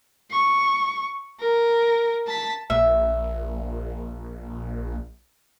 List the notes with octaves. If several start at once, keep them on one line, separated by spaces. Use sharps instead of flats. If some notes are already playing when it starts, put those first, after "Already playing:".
C#6
A#4
A5 B6
A#1 E5